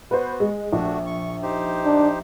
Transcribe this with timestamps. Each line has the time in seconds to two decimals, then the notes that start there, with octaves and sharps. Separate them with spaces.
0.11 B3 F#4 B4 C5
0.40 G#3
0.73 A#1 A3 D4 F#4
1.07 C#6
1.42 D#4 G4 C5
1.85 D4